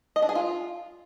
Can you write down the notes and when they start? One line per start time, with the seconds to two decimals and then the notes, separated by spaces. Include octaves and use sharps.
0.16 D#5
0.22 D4
0.29 G#4
0.35 F4